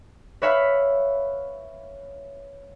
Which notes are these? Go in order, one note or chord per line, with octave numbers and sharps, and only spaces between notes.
B4 C#5 E5 F5 B5